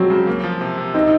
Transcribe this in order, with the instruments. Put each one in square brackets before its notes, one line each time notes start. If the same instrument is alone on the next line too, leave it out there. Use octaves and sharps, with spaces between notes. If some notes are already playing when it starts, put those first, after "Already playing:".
Already playing: [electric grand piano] F3 G#3 C4 [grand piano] F#3
[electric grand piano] C#3
A#3
F3
C3
C3
[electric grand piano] C4 [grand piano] D#4